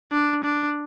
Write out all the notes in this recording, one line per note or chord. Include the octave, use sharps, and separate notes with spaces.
D4
D4